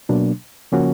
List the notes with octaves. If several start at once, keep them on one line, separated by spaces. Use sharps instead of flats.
B2 F#3 A#3 D4
C#3 F3 A#3 C#4 F#4